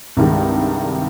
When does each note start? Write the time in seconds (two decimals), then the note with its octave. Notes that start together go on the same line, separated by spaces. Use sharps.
0.17 C2 G2 D#3 G#3